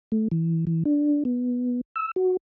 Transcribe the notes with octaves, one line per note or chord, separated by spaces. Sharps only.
A3
E3
E3
D4
B3
E6
F#4